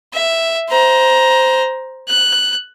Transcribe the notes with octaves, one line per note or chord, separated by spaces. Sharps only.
E5
C5 A#5
F#6